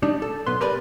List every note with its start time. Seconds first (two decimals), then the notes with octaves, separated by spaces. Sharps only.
0.02 G3 D4 D#4
0.22 A4
0.46 B1 B3 B4 C6
0.61 G4 A#4 B4 D5 G#5